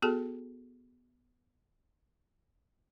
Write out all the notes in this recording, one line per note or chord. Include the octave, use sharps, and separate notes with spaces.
B3 F#4 G#4 A4 A5